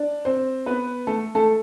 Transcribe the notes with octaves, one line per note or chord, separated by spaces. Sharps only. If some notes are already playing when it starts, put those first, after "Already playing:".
Already playing: D4 D5
C4 C5
B3 B4
A3 A4
A3 A4